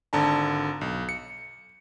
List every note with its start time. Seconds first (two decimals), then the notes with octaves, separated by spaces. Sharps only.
0.13 G#1 D3 A5 A#5
0.81 B1
1.09 C#7